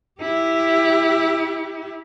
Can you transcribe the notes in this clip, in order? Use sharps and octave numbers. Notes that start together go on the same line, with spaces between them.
E4 G4